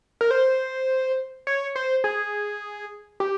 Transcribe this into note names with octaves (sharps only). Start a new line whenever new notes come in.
A#4
C5
C#5
C5
G#4
G4